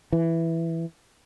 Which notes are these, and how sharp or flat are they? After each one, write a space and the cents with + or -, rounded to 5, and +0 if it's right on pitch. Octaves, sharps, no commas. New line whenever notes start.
E3 +5